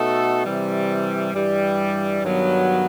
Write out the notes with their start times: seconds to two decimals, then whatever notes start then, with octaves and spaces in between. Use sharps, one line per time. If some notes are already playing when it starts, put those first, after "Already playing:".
Already playing: B2 A3 D#4 F#4 A4
0.45 C3 E3 G3
1.33 G2 E3 G3
2.22 G2 D#3 F#3 B3